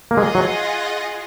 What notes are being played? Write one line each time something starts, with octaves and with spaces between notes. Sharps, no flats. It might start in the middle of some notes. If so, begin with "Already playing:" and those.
A#3
G#3 F4 G#4 D#5 F#5
F#3